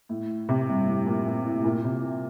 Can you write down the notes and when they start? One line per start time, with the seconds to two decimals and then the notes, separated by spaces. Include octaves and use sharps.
0.09 A2
0.49 C3
0.68 G2
0.86 A2
1.06 A#2
1.26 A#2
1.44 A2
1.64 A#2
1.84 C3